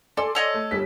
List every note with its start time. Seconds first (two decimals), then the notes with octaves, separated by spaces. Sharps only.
0.17 A4 D5 G#5 C6
0.35 A4 C#5 D#5
0.54 A3
0.71 G1 G3 B6